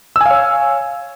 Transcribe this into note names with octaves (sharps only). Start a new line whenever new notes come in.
C#5 F5 G#5 E6